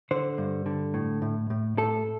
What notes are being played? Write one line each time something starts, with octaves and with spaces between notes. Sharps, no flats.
D3 C5
G2
D3
A2
A2
A2
A2 A4